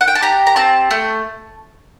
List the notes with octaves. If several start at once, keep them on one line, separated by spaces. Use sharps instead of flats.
F#5
G5
A5
G4 A#5
A#5
C4 A5
A3